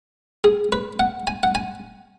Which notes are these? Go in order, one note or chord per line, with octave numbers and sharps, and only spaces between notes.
G#4
B4
F#5
G#5
F#5
G#5